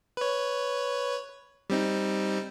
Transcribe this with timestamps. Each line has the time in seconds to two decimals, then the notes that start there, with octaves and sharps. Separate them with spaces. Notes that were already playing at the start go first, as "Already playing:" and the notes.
0.17 B4 C#5
1.70 G3 C4 D#4